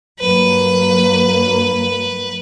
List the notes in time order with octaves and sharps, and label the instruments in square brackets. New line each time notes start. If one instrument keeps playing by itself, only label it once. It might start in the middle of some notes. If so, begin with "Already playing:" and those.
[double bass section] G2 F#3 A#3 [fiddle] B4